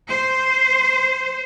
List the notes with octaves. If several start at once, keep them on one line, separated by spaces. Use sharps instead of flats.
C5